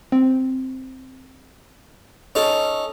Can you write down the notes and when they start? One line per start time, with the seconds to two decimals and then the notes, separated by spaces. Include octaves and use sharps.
0.12 C4
2.35 C#4 D#4 A4